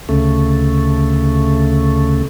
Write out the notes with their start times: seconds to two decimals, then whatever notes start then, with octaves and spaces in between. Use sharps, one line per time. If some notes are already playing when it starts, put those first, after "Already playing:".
0.09 D2 C#3 A3